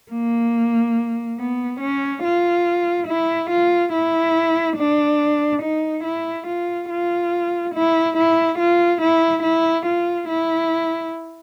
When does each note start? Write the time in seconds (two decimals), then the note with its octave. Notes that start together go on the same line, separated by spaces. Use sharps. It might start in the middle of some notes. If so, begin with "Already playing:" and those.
0.12 A#3
1.39 B3
1.80 C#4
2.24 F4
3.08 E4
3.50 F4
3.92 E4
4.77 D4
5.62 D#4
6.04 E4
6.47 F4
6.90 F4
7.74 E4
8.17 E4
8.59 F4
9.01 E4
9.43 E4
9.86 F4
10.29 E4